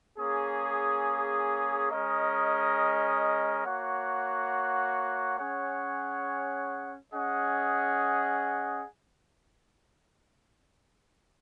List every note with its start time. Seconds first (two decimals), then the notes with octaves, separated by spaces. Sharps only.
0.17 A#3 C#4 G#4
1.91 G#3 C#4 A#4 D#5
3.65 A#3 F#4 C#5 F#5
5.38 C#4 G#4 C#5 F#5
7.12 C#4 G#4 D#5 F#5